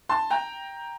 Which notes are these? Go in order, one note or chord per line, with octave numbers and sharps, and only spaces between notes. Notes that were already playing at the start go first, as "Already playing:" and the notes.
A5 C6
G5 A#5